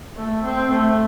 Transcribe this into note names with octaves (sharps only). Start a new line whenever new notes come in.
A3
C4
A3